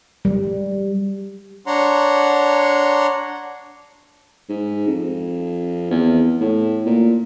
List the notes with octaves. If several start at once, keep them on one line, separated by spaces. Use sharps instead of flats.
G3
D4 C#5 F#5 A#5 C6
G#2
F2
E2
A2
A#2